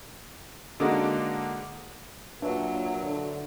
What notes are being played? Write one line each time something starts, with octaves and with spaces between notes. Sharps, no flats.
D3 G#3 A#3 D4 D#4 F#4
A#2 F#3 D4 B4 C#5 E5
D3